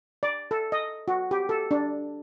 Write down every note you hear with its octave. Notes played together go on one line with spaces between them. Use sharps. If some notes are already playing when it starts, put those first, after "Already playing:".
D5
A4
D#5
F#4
G4
A4
D4